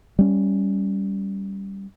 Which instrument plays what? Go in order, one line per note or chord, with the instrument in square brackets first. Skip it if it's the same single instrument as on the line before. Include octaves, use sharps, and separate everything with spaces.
[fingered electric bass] G3 C#4